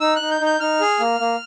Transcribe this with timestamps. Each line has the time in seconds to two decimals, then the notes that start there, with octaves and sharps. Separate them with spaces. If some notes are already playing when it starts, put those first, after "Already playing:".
0.01 D#4 E6
0.16 D#4 F#6
0.31 G6
0.41 D#4 G6
0.60 D#4 F6
0.81 G#4
1.00 A#3
1.20 A#3